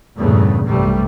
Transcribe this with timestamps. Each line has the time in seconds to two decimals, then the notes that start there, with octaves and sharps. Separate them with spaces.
0.16 E2 G2 A#2 C#3 A3 B3
0.65 B1 G2 C3 G3 A3